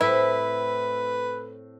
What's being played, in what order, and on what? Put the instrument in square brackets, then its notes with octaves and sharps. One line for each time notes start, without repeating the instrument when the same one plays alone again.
[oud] A2 C4 A4 [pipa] E4 [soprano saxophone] B4